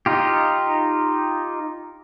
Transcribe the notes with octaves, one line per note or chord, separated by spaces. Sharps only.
D#4 F4 G4